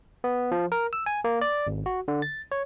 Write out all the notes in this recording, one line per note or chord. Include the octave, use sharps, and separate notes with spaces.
B3
F3
A#4
E6
G#5
A#3
D5
G#1
F#4
D3
A6
C#5